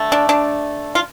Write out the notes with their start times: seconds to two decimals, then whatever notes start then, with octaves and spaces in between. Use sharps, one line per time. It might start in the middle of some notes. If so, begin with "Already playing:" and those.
Already playing: D3 A3
0.12 D4
0.29 D4
0.95 F4